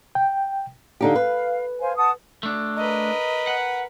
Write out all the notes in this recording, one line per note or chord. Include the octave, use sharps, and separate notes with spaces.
G5
D3 D#4 G4 F5
B4
C5 F5 G#5
F#5 A5 D#6
A3 D4
A#4 B4 D#5
F#5